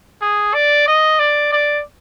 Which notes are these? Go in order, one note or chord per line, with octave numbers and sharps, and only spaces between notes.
G#4
D5
D#5
D5
D5